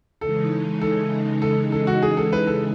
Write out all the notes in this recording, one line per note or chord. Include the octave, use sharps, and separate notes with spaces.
C#3 E3 G#3 D#4 A4
A4
A4
A4
F#4
G#4
A4
B4
A4